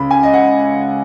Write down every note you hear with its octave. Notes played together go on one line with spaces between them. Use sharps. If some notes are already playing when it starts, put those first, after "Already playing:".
Already playing: C#2 C#3 B5
G#5
D#5
F#5